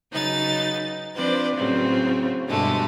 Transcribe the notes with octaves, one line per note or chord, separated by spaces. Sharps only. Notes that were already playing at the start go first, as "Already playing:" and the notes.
C#3 F#3 D#4 B4 A6
F3 C4 D4 B4 C5 D5
A2 C#3 F#3 C4
G2 B2 D3 G#3 A3